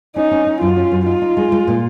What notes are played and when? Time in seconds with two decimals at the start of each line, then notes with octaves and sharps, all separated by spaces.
0.16 C#4 D#4
0.31 C#4
0.47 C#4
0.61 F#2 F4
0.76 C#4
0.92 F#2
1.06 D#4 F4
1.22 D#4
1.37 G#3
1.52 G#3
1.67 A#2